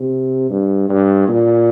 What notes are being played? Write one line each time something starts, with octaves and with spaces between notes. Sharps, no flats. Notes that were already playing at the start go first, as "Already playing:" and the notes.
Already playing: C3
G2
G2
A#2